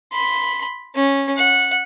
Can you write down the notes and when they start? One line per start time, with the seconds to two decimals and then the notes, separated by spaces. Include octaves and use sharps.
0.12 B5 C6
0.95 C#4
1.37 F#5